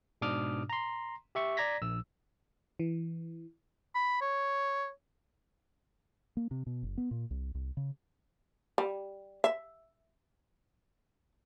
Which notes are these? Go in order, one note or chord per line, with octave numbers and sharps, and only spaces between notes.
G#2 B2 D4 D6 D#6 F6
A#5 C6
G4 E5 C#6
D5 A#5 G#6 A#6 B6
A#1 E6
E3
B5
C#5
A#3
C3
B2
F#1
B3
A#2
C2
C2
C#3
G3
E5